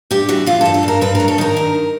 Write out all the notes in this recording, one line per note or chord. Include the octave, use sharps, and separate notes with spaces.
G2 G4
E3 F#4
E3 F4
A4
G2
A4
G2 A#4
G2 B4
A#4
F#3
A4
D#3 A#4
G2